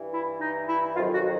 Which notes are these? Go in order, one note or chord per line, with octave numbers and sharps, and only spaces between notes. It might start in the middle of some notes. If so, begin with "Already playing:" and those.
Already playing: G2 E3
E4
D#4
E4
F2 C3 D#3 F#3 F4
F#4